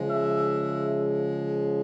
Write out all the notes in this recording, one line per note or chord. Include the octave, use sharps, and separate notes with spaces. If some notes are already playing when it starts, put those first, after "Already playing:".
Already playing: C#3 F3 G#3
E5